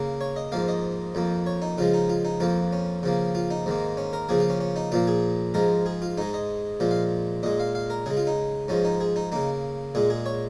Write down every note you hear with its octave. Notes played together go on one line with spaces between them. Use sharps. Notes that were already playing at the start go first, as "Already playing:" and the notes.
Already playing: C#3 A#3
C#5
D#5
G#2 F3 A#3 F5
D#5
F2 F3 A#3
C#5
D#4
C#3 F3 G#3 F4
D#4
F4
D#4
F2 F3 A#3 F4
C#4
C#3 F3 A#3
F4
D#4
G#2 D#3 A#3
C#4
A#4
C#3 F3 A#3 G#4
F4
C#4
C#4
D#4
A#2 F3 A#3 F4
G#4
G#2 F3 G#3 A#4
G#4
F4
G#2 G#3 D#4
D#5
A#2 F3 G#3
F5
A#2 G#3 D#5
F5
F5
A#4
C#3 G#3 G#4
F4
D#4
G#2 F3 G#3 C#4
D#4
G#4
D#4
C#3 A#3 D#4
A#2 G#3 G#4
G#4
C#5